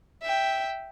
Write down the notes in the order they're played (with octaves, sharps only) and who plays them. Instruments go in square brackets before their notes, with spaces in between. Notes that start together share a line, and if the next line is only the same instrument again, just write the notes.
[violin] E5 G5